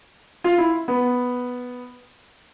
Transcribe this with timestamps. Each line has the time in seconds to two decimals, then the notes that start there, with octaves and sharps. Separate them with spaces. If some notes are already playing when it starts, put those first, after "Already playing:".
0.44 F4
0.58 E4
0.88 B3